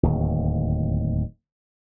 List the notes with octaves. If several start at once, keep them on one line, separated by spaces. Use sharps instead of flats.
D1 D#2